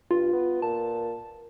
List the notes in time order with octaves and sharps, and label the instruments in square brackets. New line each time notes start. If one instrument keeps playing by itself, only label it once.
[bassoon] G2 [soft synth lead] F4
[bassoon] B3
[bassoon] A#2 [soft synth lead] A5